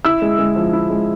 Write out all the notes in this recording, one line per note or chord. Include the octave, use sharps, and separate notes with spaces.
E4 E6
G#3
G#3
F3
E4
G#3